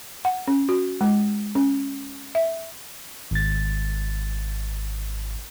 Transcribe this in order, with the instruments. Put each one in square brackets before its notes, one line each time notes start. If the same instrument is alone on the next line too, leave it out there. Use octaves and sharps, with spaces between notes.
[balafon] F#5
C#4
F#4
G#3
C#4
E5
[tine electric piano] G#1 A6